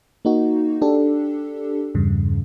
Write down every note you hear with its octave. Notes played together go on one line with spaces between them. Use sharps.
A#3 D#4 F#4
D4 G4 A4
E2 G2 C#3